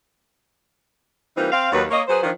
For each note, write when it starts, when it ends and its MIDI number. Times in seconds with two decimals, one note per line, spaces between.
1.37 1.51 52
1.37 1.51 55
1.37 1.51 58
1.37 1.51 60
1.37 1.51 63
1.37 1.51 65
1.52 1.70 60
1.52 1.70 77
1.72 1.84 39
1.72 1.84 54
1.72 1.84 71
1.90 2.02 58
1.90 2.02 73
1.90 2.02 75
2.08 2.21 54
2.08 2.21 68
2.08 2.21 71
2.08 2.21 72
2.23 2.31 51
2.23 2.31 53
2.23 2.31 62